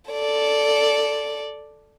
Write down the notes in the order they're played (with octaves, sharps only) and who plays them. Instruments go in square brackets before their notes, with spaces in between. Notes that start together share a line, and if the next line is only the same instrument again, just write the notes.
[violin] A4 D5